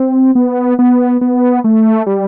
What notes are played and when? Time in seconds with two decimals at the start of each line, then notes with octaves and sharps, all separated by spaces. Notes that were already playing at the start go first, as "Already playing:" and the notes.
Already playing: C4
0.35 B3
0.79 B3
1.21 B3
1.64 A3
2.06 G3